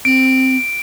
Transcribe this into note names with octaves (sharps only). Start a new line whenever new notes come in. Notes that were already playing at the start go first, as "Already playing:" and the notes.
C4 D7